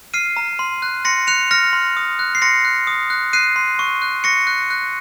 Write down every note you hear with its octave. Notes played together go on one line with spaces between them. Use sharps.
F6 C7 D#7
A#5
C6
F#6
C6 A#6 C#7
F#6 C#7 F7
F6 A#6 C#7
C6
D#6
F#6
C7
C6 A#6 C#7
F#6
D#6
F#6
F#6 C7 D#7
C6
C#6
F#6
C#6 A#6 C#7
F#6
F#6